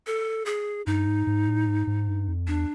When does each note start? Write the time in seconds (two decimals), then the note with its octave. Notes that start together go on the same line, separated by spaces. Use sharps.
0.07 A4
0.46 G#4
0.86 G2 D#4
1.07 G#2
1.27 G#2
1.47 A2
1.67 G#2
1.87 G#2
2.08 G2
2.28 F2
2.47 E2 D4